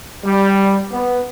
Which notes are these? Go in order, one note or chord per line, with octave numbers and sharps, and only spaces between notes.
G3
B3